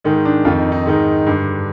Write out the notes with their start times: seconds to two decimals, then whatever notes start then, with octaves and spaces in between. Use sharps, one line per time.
0.04 G#2 D#3 G#3
0.25 D4
0.45 F2 D#3 F4
0.58 D#4
0.72 D#4
0.86 G#2 D#3
1.26 G2 D3